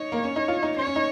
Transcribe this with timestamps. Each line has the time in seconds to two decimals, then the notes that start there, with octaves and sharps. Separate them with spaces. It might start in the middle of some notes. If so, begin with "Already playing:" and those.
Already playing: D#4 C#5
0.12 A#3
0.24 C#4
0.36 D#4
0.48 F4
0.63 D#4
0.77 C#4 C#5
0.87 C#4
0.96 D#4